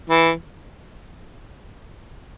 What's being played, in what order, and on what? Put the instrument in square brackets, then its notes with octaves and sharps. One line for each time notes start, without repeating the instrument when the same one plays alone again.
[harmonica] E3